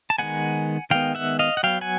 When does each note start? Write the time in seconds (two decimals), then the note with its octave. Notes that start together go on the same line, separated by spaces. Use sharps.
0.10 A5
0.18 D#3 G#3 B3 F#5 G#5
0.90 D#3 G#3 B3 F5 G5
1.15 E5 F#5
1.39 D#5 F5
1.57 F#5
1.63 F#3 B3 F5 G5
1.81 F#5 G#5